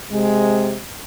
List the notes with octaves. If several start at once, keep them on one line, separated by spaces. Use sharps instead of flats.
C3 G#3